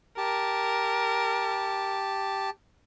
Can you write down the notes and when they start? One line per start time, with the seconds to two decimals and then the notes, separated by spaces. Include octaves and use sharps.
0.18 G4 A#4 A5